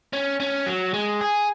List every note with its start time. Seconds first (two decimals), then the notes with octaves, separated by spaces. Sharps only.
0.13 C#4
0.40 C#4
0.67 F#3
0.94 G#3
1.21 G#4